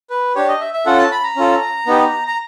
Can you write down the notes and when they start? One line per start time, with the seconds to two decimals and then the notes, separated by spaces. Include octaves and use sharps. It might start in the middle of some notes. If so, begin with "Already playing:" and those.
0.10 B4
0.35 D4 G4 C#5
0.48 D#5
0.60 E5
0.74 E5
0.86 C#4 F4 A4 F#5
0.99 A5
1.12 B5
1.23 A#5
1.36 C#4 F4 A4
1.87 B3 D#4 G4
2.27 A#5